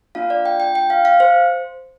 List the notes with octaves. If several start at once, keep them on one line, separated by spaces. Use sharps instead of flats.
A#3 D4 F4 F5
D5
G5
G5
G5
F5
F5
C5